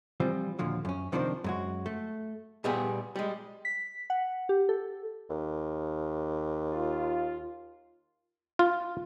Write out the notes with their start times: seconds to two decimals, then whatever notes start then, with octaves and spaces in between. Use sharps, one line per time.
0.20 E3 F3 G3 C4 F4
0.59 D#2 A#2 D3 F3 F#3
0.85 F#2 C#4
1.12 C3 D#3 F3 A#3 D4 C5
1.44 F#2 G#3 F#4
1.86 A3
2.64 A#2 G3 B3 G4 G#4
3.16 G3 G#3
3.65 B6
4.10 F#5
4.49 G4
4.69 A4
5.30 D#2
6.72 F4
8.59 F4